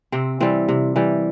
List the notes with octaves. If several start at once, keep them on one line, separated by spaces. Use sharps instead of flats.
C3 C4
E3 G3 C4
C3
E3 G3